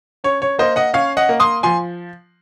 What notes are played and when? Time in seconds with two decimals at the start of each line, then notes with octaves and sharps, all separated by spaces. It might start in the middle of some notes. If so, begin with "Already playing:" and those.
0.24 C#4 C#5
0.42 C#5
0.59 A#3 C5 D#5
0.76 D#5 F#5
0.94 C#4 C#5 F5
1.17 D#5 F#5
1.29 A#3
1.40 C6 D#6
1.63 F3 G#5 C6